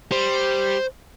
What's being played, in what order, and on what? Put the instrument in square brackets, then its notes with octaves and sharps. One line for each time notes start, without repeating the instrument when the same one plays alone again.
[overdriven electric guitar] G3 [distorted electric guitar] C5